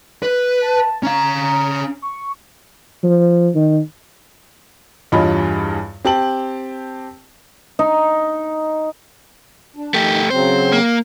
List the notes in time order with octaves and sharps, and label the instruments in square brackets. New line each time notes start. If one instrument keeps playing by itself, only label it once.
[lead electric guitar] B4
[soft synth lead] A5
[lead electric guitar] C#4 F5 [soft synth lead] A#5
[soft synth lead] C#6
[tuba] F3
D#3
[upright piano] E2 G2 F4 C#5 D#5 B5
C4 G4 A5 F#7
[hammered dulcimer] D#4
[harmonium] D4
[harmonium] D#3 [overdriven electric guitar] A3 G4
[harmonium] C#3 F#3 C4 [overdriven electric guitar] C5
[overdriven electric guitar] A#3